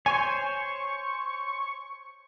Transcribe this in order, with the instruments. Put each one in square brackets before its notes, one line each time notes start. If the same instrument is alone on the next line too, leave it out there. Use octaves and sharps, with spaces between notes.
[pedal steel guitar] C5 C#5 [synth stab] G#5 [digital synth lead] C#6